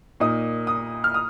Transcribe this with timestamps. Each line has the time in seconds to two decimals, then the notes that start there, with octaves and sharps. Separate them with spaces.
0.20 A#2 A#3 D#4 D#6
0.67 D#6
1.04 F6
1.14 D#6